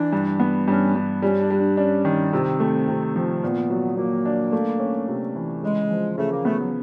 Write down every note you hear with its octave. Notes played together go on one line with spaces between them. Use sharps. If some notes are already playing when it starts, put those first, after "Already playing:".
Already playing: E3 D4
G2
B3
G2 C#4
G2
G3 C#4
D4
G3
D4
C#4 D4
D#3
C3 C4
A3
C3
F3
A#2 B3
F#3
F#3 A#3
D4
A3
C#4
C3
E3
C#3 G#3
F3
C#3 A3
A#3
A3 B3
F#3